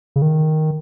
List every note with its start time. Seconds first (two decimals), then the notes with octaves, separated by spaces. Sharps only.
0.16 C#3
0.22 D#3